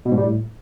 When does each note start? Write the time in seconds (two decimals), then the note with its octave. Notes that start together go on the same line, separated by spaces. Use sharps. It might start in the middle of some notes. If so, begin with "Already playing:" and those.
0.05 B2
0.12 G#2
0.18 G3
0.24 A2